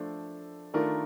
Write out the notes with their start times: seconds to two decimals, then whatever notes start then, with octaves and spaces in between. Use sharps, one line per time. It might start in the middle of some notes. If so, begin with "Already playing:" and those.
Already playing: F3 A3 D4 A4 C5
0.74 D#3 A3 D4 F4 A#4